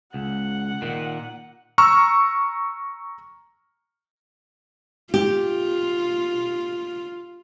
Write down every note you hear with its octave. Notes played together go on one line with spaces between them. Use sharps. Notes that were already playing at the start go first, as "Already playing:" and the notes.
C#2 F#5
A#2 D#3
A#5 C#6 E6 F6
F4 G4